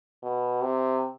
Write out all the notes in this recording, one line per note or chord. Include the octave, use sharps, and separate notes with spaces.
B2
C3